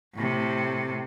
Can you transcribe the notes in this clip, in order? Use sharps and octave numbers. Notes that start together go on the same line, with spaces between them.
A2 C3